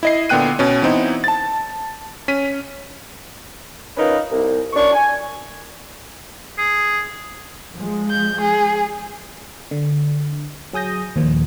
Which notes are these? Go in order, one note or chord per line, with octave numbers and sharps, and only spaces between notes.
E4 D#5 C7
A#2 D3 B3 G5 F#6 D#7
B2 C#4
E3 B3 C4 D#4 E4
A5 A6
C#4 B6 D#7
C#4 D#4 F4 A#4 B4
C2
F#2 D4 C#6
G#5
G#4
F3 G#3
G6
G#4
D3
F#3 G#4 D#6 G6 A#6
D#2 A#2 F3